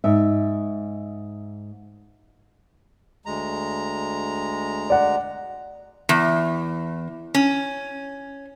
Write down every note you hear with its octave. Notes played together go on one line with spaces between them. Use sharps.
G#2 E5
D2 G#3 A#5
D5 F#5
E2
C#4